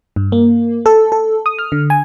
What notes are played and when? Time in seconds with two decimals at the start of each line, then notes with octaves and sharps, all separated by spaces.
0.16 G2
0.32 A#3
0.86 A4
1.12 A4
1.46 D#6
1.59 F6
1.72 D3
1.90 G#5